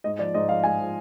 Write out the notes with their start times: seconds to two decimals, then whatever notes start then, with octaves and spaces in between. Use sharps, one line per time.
0.04 G#2 D#5
0.19 F3 D5
0.34 G#2 D#5
0.49 F3 F5
0.64 G#2 G#5
0.79 F3